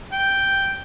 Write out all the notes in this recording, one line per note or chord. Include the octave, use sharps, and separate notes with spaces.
G5